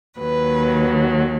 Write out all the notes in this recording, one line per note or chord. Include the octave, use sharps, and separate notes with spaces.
D#2 D#3 F#3 B4